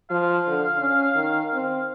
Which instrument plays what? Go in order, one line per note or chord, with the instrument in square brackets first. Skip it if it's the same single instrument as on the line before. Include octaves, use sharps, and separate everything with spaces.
[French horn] F3 [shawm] F5
[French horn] D3
C#4
D#3
C4